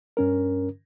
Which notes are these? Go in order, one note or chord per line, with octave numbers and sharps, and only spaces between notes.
G2 C#4 A#4